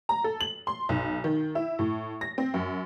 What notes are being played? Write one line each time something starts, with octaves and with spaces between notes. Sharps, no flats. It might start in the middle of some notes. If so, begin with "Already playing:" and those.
A#5
A4
F#7
C6
B1
D#3
E4
A2
A#6
C4
F#2